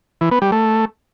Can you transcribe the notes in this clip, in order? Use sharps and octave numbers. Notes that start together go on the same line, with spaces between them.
E3
B3
G3
A3